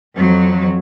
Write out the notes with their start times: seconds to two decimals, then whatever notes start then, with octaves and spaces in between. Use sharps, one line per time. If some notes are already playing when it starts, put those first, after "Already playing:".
0.15 F2 F#3